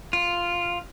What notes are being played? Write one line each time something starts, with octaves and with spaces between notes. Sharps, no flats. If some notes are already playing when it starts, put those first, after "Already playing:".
F4